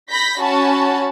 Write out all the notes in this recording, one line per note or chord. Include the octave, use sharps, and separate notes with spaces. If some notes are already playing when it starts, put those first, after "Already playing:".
B5 G6 A#6 B6
C#4 F#4 A5 B5